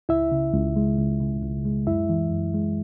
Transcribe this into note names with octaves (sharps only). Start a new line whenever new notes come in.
C#2 E4 E5
C#3
C#2
G#3
C#2
C#3
C#2
G#3
F#2 E4 E5
E3
F#2
G#3